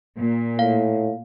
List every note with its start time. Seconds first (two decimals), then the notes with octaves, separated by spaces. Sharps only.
0.17 A#2
0.59 A2 F5